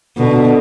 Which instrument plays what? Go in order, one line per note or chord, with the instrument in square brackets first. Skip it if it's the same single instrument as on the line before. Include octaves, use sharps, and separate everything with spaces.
[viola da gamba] B2 [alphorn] D3